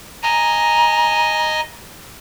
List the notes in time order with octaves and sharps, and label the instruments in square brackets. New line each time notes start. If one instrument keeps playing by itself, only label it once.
[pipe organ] D#5 G#5 [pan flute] A#5